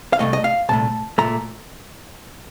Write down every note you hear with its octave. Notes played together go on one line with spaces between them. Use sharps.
F5
C2 A#2 A3 D#5
D#5
F5
C2 A#2 A3 A5
A#2 A3 A#5